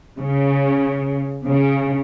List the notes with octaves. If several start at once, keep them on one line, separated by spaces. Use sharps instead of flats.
C#3
C#3